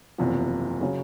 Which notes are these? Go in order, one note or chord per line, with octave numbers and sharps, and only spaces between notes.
F#1 E2 C3 F3
C#3 F#3